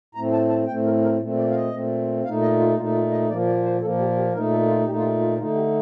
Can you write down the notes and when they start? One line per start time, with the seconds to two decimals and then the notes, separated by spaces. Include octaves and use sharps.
0.15 A2 A3 C4 A#5
0.32 A5
0.49 A5
0.67 A2 A3 C4 G5
0.84 A#4
1.02 A#4
1.20 A#2 A3 C4
1.37 D5
1.50 F5
1.54 D#5
1.72 A#2 A3 C4
2.24 A#2 A3 D#4 F5
2.41 D#5
2.59 F4
2.76 A#2 A3 D#4 F4
2.94 F4
3.11 D#5
3.29 A#2 F3 A#3 D5
3.47 D5
3.63 C5
3.81 A#2 F3 A#3 A4
3.99 G4
4.16 G4
4.33 A#2 A3 D#4 A#4
4.51 A4
4.68 F4
4.86 A#2 A3 D#4 G4
4.96 F4
5.03 G4
5.20 F4
5.38 D3 A3 D#4 F4
5.55 G4